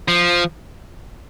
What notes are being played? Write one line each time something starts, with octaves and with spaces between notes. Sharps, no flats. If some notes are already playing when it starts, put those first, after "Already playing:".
F3